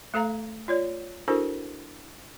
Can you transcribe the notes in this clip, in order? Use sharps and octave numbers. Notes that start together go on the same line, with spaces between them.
A3 A4 F5 A#5
F4 C#5 D5
D4 E4 F#4 A4 A#4 C5